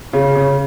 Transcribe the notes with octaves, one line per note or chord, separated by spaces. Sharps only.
C#3
C#3